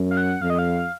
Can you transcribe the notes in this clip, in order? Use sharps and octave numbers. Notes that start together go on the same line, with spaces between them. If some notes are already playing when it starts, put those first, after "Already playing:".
Already playing: F#2
F5
F#5
F2 F5
D#5
F5